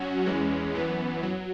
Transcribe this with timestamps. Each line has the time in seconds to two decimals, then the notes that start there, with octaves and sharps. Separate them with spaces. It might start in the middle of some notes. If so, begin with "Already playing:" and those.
Already playing: F#2 F#3 C#4 F#4
0.26 E2 E3 G#3 C#4
0.75 F#2 E3 B3
1.23 F#3